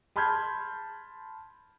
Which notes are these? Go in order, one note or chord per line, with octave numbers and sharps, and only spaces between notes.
A5 B5 C6 F6 G6 G#6